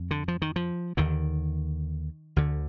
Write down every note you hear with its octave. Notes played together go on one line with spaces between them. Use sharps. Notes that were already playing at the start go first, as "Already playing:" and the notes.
Already playing: F2
D3
F3
D#3
F3
D#2 D3 D#3
D2 D3